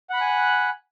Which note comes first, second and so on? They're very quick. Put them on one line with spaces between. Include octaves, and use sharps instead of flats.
F#5 B5 F#6 G#5